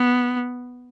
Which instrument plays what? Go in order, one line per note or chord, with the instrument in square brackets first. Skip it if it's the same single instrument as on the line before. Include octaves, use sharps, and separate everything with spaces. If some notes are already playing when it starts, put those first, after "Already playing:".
Already playing: [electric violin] B3